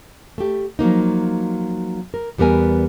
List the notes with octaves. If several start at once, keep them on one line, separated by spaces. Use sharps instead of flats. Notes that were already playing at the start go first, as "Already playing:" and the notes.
A3 G4
F3 F#3 A#3 D#4
A#4
E2 G3 B3 A#4 G#5